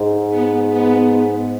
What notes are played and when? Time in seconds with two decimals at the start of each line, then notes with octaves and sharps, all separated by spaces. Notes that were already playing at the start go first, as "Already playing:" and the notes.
Already playing: G#2
0.30 B3
0.70 B3